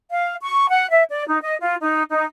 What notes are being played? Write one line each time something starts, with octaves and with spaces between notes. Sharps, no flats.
F5
C#6
F#5
E5
D5
D#4
D#5
F4
D#4
D#4